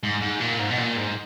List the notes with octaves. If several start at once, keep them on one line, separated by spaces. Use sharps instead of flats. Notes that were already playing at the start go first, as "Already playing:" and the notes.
G#2
G#2
A#2
G#2
B2
A#2
G#2